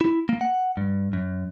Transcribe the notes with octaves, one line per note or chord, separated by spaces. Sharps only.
E4
A#3
F#5
G2
F#2